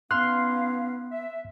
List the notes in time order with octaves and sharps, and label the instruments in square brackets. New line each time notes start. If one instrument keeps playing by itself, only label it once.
[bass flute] B3 [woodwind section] C#4 D#4 F5 [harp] C6 F6 [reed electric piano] F#6
[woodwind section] E5